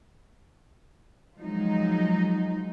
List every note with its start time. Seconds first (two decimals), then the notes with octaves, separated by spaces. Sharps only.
1.36 F3 F#3 G#3 D#4